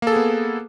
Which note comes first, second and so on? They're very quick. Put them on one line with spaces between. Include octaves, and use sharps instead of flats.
A#3 A4 G#4 B3